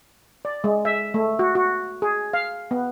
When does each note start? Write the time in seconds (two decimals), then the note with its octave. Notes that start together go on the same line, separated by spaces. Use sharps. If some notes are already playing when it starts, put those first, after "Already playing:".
0.45 D5
0.64 G#3
0.85 E5
1.14 A3
1.39 F#4
1.55 F#4
2.02 G#4
2.33 F5
2.71 B3